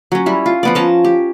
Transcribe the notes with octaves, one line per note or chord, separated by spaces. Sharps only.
F#3 C#4
G3 E4
F4
F3 B3 D5
C#4 A5 A#5
G4